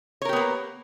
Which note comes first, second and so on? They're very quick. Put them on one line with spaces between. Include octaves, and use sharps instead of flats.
C#5 A#4 G4 B3 A#3